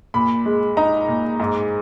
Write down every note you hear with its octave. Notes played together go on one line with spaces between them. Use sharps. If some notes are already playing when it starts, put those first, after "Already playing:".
A#2 B5
G#3
D#4 A#5
A#2
G#2